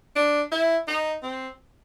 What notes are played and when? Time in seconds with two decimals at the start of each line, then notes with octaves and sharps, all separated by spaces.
0.16 D4
0.52 E4
0.88 D#4
1.23 C4